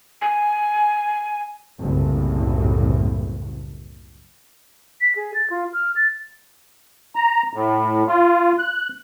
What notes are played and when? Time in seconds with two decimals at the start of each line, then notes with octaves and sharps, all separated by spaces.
0.21 G#5
1.80 F#1 C2 A2
5.01 B6
5.16 G#4
5.34 A6
5.50 F4
5.73 F6
5.96 A6
7.16 A#5
7.53 A2
8.08 F4
8.59 F#6